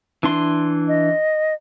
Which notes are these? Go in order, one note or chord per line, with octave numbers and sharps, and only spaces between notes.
E3 D4 C6
D#5